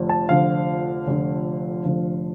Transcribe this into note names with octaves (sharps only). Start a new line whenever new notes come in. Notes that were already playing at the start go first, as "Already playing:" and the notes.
Already playing: F1 F2 D3 F3
A5
F1 F2 D3 F3 F5
F1 F2 D3 F3
F1 F2 D3 F3